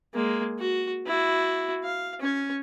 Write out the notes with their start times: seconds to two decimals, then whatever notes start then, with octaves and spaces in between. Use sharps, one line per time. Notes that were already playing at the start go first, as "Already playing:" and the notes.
0.14 G#3 A#3
0.59 F#4
1.06 E4 F#4
1.84 F5
2.20 C#4 C#5